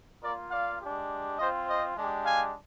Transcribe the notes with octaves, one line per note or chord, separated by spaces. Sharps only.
A#3 F4 A#4 D5
D5 F5
G#3 D4 G4
C4 F4 C5 D#5
C5 D#5
G#3 D4 G4
F5 G#5